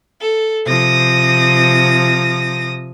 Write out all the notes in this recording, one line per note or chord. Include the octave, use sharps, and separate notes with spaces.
A4
C3 F3 D#6 A#6